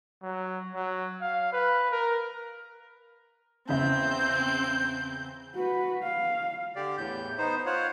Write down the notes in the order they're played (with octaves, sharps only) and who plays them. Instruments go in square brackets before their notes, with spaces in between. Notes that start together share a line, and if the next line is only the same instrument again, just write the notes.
[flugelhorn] F#3
F#3
F5
B4
A#4
[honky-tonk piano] E2 C#3 E5 [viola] C4 [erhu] G6
[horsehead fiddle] F#4 B4
F5
[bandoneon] D3 G4 D5
E2 A2 G6
B3 D#4 C5
F4 C5 C#5 F#5